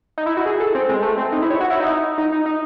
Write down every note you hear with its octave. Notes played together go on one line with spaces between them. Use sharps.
D#4
E4
F#4
G#4
A4
C4
G#3
A3
C4
D#4
E4
C#5
F#4
E4
D#4
D#4
D#4
D#4